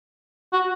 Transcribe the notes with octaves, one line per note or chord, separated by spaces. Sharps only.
F#4